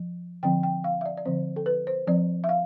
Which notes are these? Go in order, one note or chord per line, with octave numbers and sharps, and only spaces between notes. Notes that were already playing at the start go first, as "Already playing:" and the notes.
Already playing: F3
D3 F3 C4 G5
G5
F5
E5
D5
D5
D3 F3 C4 C5
A4
B4
C5
F3 C4 D5
E5
F5